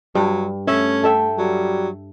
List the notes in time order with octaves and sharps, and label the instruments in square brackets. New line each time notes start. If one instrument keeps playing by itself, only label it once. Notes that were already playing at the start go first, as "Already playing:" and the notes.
[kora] G2 [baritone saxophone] F#3
[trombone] A3 [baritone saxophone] C#4 [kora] E5
[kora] A4 E5 G5
[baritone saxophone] F#3 [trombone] G3